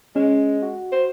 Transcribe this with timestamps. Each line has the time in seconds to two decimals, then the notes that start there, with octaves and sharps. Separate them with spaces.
0.16 G#3 C#4
0.62 F#4
0.92 C5